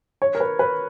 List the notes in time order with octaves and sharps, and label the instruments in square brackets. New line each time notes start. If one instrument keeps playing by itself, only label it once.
[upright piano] C#5
A#4
B4
B4